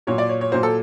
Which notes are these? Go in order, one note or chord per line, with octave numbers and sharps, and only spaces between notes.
A#2 F#3 C#5
D5
C#5
C#5
A#2 F#3 C5
A4